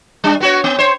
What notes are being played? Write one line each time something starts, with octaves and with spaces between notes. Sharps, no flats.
G3 D4
B3 F#4 C#5
B3
C5 C#5